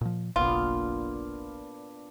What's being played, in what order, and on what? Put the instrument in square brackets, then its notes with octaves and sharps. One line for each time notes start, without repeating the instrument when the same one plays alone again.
[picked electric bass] A#2 F3
[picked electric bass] F#1 B1 [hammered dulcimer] A#2 B3 D4 [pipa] F4